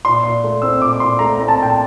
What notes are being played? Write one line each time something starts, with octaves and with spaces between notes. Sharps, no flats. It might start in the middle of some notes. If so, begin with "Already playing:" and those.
A#2 C6
A#2
A3
C4 E6
A#2 D6
D6
A#2 C6
A3 A#5
C4 A#5
A5
A#2 G5
A5